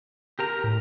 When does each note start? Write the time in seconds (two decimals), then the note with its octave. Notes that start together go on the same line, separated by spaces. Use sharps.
0.39 G4 A#4 A#5
0.64 A2